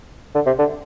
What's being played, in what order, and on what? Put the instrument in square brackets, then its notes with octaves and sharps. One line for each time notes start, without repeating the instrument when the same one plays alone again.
[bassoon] D3
C3
D3